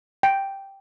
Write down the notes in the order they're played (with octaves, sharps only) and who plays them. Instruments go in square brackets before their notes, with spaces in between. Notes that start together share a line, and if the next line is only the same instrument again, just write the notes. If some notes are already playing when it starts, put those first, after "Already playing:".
[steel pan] G5